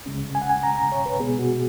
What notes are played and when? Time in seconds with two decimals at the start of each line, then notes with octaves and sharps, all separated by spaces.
0.06 C#2 C#3 G#3 C#4
0.35 G#5
0.42 F#5
0.50 G#5
0.63 A#5
0.78 A#5
0.92 C#5
1.06 B4
1.20 B2 G#3 B3 G#4
1.39 F#4